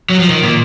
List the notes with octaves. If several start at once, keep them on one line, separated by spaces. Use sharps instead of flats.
F#3
F3
D#3
A#2